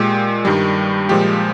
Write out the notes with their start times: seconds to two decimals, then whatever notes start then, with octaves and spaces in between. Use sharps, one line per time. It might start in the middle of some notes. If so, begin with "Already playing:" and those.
Already playing: A#2 G#3 G4
0.45 G2 D#3 G3
1.09 A#2 F3 G#3 G4